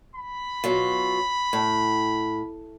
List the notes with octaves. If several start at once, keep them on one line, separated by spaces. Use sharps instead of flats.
B5
B2 F#3 F4
A2